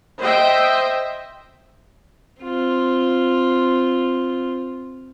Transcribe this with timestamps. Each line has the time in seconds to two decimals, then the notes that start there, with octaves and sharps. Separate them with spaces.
0.20 C5 D#5 E5 G5
2.41 C4 F4